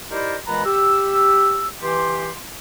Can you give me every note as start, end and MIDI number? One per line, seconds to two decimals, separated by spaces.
0.11 0.36 63
0.11 0.36 64
0.11 0.36 67
0.11 0.36 70
0.11 0.36 72
0.11 0.36 74
0.47 0.63 46
0.47 0.63 52
0.47 0.63 56
0.47 0.63 59
0.47 0.63 82
0.47 0.63 83
0.66 1.67 67
0.66 1.67 88
1.82 2.32 52
1.82 2.32 67
1.82 2.32 84